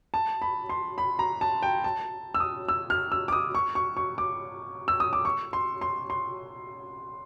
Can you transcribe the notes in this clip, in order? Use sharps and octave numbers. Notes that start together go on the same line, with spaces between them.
A5
B5
C6
B5
A#5
A5
G5
A5
E6
D#6
E6
F6
E6
D6
D#6
C#6
C#6
C#6
D6
E6
D#6
D6
C#6
C6
C6
C6